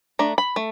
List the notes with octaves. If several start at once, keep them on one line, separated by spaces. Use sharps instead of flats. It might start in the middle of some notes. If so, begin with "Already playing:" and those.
A3 D4 A#5
B5
A3